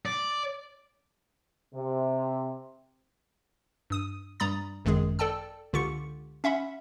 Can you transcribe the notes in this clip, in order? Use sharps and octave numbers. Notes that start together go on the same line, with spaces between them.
D5
C3
G2 D#6 D#7
G2 G3 A#5 B5 D#6 A6
G#1 F#2 D#3 G#3 G#4
A4 D5 G5 A5 E6
C#2 D3 F4 G4 C#6 C#7
C#4 E5 F#5 B5